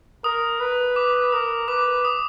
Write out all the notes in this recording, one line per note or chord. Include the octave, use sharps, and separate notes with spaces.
A#4 D#6
B4
D6
A#4 D#6
B4 D6
D#6